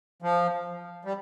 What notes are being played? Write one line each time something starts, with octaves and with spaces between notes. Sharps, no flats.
F3
G3